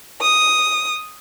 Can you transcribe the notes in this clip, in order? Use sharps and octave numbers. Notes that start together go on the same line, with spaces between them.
D#6